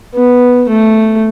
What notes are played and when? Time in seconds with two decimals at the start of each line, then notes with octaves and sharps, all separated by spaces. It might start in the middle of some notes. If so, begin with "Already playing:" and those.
0.15 B3
0.69 A3